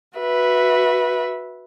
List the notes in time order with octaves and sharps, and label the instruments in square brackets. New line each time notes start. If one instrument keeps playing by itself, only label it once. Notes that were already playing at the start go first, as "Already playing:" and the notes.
[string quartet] F#4 B4 E5